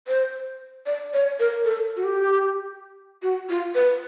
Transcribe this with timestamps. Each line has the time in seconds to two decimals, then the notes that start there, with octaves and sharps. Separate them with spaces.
0.08 C5
0.86 D5
1.14 C#5
1.40 A#4
1.65 A4
1.96 F#4
2.04 G4
3.22 F#4
3.49 F4
3.75 B4